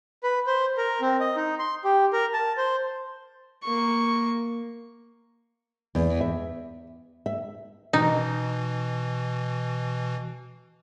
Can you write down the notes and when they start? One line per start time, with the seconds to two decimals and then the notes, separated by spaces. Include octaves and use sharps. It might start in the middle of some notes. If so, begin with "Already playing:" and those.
0.23 B4
0.47 C5
0.77 A#4
1.01 C4
1.20 D#5
1.36 D#4
1.59 C6
1.85 G4
2.13 A#4
2.33 A5
2.57 C5
3.64 A#3 C#6
5.95 E2
6.21 E5
7.26 E5
7.93 B2 E3 D#4